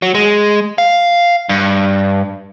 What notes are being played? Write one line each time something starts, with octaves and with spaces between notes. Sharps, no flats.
F#3
G#3
F5
G2